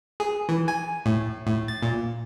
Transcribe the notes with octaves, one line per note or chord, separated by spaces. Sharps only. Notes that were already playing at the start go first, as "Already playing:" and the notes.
G#4
E3
G#5
A2
A2
A6
A#2